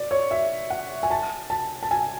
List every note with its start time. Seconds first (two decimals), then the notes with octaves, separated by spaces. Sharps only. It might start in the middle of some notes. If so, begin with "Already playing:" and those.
Already playing: D5
0.11 C#5
0.31 E5
0.70 F#5
1.03 G#5
1.11 A5
1.50 A5
1.83 A5
1.91 G#5